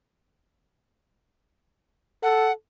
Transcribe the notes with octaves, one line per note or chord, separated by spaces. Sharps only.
A4 F#5